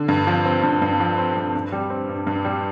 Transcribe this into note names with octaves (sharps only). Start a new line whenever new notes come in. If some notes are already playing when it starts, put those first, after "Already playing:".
Already playing: D3
G2
F3
C4
G2
G2
F3
C4
G2
G2
G3
C4
G2
G2
G3